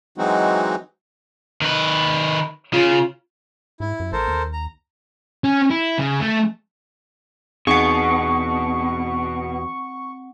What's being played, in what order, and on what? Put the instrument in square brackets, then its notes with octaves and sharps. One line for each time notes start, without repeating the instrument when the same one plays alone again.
[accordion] E3 F#3 G#3 C4 D#4 F#4
[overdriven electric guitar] D#3 B4
[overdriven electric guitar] C#3 [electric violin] F4
[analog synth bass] G#2 [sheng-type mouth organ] E4
[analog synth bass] F#2
[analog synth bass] A1 [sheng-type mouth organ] A4 A#4 C5
[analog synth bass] D#2
[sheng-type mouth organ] A#5
[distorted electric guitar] C#4
E4
C#3
A3
[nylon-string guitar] E2 D#4 G#4 [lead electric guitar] B2 [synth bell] C4 F#5 [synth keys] C#6